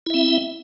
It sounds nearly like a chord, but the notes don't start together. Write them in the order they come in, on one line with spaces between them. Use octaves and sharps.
E4 E5 C4